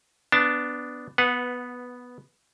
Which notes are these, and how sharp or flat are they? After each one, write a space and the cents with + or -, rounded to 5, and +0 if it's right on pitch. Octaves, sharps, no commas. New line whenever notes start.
B3 +10 D4 +0 A5 +10
B3 +0 B4 +10 F#5 -20